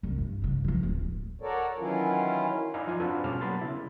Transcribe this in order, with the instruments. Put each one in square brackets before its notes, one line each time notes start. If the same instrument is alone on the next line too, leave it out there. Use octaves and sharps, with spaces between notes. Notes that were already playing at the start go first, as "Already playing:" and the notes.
[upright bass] C2 G3
G2
G2 C#3
C#2 F3
D1
[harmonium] F#4 A4 A#4 C#5 D5
D#3 E3 F#3 C#4 E4 F4
[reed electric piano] D#4 E4 D5 E5 F5 G#5
F3 F4 G#5
C4 D4 F4 F#4 A4 B4
B2 G3 C#4 D5 A5 F6
F#3 A#3 B3 B5 C6 A6
C#3 E4